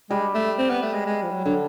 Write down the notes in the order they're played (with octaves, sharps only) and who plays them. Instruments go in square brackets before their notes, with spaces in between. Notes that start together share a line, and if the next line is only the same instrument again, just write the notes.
[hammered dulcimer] G3 [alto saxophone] G#3
[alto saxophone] A3
C4
B3
A3
G#3
G#3
F3
F#3
[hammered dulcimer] D3 [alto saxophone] F#3